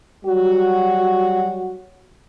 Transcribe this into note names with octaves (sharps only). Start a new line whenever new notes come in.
F#3 G3 F#4